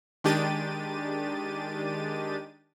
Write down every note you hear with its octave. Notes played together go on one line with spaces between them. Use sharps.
D#3 G#3 D4 G4 A6 D#7